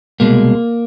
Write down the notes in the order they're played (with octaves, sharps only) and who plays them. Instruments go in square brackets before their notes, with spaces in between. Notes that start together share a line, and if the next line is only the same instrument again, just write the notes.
[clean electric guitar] C2 B2 G#3 A#3